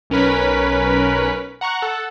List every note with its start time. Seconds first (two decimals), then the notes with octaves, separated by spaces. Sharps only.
0.10 B1 C#4 A#4 B4 B6
1.61 F#5 A#5 C#6 F#6
1.82 A4 F#5